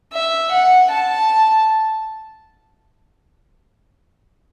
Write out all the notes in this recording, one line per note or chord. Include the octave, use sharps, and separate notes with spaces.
E5
F#5
A5